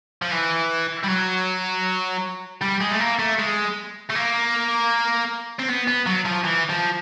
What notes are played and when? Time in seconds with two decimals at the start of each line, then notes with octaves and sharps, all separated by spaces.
0.22 F3
0.32 E3
1.04 G3
1.09 F#3
2.62 G3
2.81 G#3
2.91 A3
3.00 A#3
3.19 A3
3.39 G#3
4.10 A3
4.15 A#3
5.59 C4
5.68 B3
5.88 B3
6.06 F#3
6.26 F3
6.44 E3
6.70 F3